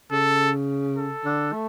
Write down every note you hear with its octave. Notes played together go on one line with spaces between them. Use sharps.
C#3 A4
A4
D3
A3